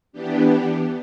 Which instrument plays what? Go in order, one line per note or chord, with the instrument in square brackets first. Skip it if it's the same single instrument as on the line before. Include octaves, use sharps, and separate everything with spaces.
[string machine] E3 B3 D4 G4